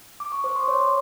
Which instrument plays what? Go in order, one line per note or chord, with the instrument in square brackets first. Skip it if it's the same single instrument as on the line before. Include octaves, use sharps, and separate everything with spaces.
[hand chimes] D6
C#6
C5
C6
C#5